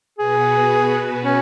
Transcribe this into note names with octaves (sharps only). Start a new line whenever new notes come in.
B2 B3 F#4 G#4 B4
C#4